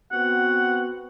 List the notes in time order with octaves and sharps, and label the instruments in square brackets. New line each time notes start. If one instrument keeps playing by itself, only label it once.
[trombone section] B3 C4 F#4 [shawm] F#5